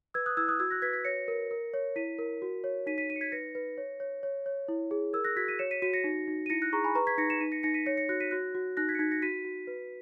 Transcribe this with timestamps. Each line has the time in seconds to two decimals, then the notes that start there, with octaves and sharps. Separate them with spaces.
0.14 B4 E6 G#6
0.26 D#6 F#6
0.37 E4 E6 G#6
0.48 D#6 F#6
0.60 F#4 E6 G#6
0.71 F#6 A#6
0.82 B4 G#6 B6
0.93 G#6 B6
1.05 C#5 A#6 C#7
1.28 A#4
1.51 A#4
1.74 C#5
1.96 E4 B6 D#7
2.18 A#4
2.42 F#4
2.64 C#5
2.87 D#4 B6 D#7
2.98 B6 D#7
3.09 D#4 B6 D#7
3.16 C#7
3.21 G#6 B6
3.32 B4 A#6 C#7
3.55 B4
3.78 C#5
4.00 C#5
4.23 C#5
4.46 C#5
4.68 E4
4.91 G#4
5.13 A#4 E6 G#6
5.25 F#6 A#6
5.36 F#4 G#6 B6
5.48 B6 D#7
5.59 C#5 C#7 E7
5.71 B6 D#7
5.82 F#4 B6 D#7
5.94 A#6 C#7
6.04 D#4
6.28 D#4
6.46 D#7
6.50 E4 A#6 C#7
6.62 F#6 A#6
6.73 G#4 A#5 C#6
6.84 G#5 B5
6.95 B4 A#5 C#6
7.07 G#6 B6
7.18 D#4 A#6 C#7
7.30 C#7 E7
7.40 D#4 B6 D#7
7.52 A#6 C#7
7.63 D#4 A#6 C#7
7.74 B6 D#7
7.86 C#5 A#6 C#7
7.97 A#6 C#7
8.09 F#4 F#6 A#6
8.20 B6 D#7
8.31 F#4 F#6 A#6
8.55 F#4
8.77 D#4 F#6 A#6
8.89 G#6 B6
8.95 C#7
8.99 D#4 G#6 B6
9.11 A#6 C#7
9.22 F#4 B6 D#7
9.45 F#4
9.67 B4